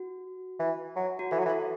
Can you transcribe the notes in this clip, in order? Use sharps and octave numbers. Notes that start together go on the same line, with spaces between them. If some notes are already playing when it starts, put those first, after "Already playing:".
Already playing: F#4
E3
F#3
F#4
E3 A4
F#3
E3
A4